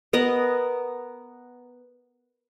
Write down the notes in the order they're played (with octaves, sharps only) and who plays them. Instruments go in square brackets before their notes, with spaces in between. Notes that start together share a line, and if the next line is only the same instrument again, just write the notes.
[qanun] B3 A#4 D#5